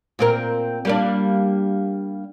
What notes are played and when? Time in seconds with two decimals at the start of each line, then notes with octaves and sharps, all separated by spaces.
0.19 A#2 C4 A#4
0.85 G3 A#3 D4